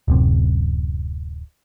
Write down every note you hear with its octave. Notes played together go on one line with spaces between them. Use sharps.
D1 F#2 C3